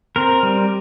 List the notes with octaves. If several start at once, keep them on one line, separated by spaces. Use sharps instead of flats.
C4 A#4
G3